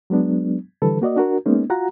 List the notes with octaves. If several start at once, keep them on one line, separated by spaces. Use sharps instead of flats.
F#3 G#3 B3 D4
D3 E3 G3 A4 B4
A#3 F#4 D5 D#5
D4 F#4 A#4
G#3 A#3 B3 C#4 D#4
F4 F#4 F#5 A#5